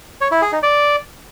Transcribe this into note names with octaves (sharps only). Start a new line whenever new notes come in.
C#5
E4
G#4
D#4
D5